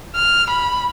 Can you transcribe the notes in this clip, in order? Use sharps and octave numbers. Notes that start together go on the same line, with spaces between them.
F6
B5